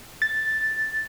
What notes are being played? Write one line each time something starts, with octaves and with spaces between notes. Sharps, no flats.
A6